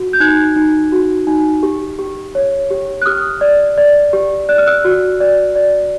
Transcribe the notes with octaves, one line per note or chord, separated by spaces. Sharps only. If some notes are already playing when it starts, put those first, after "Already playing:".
Already playing: F#4
G6
D#4 F#6 G#6
D#4
F#4
D#4
G4
G4
C#5
G4
F#6
G4 D#6 F6
D5
D5
G4
D5 F#6
F6
E6 F#6
F#4
D5
D5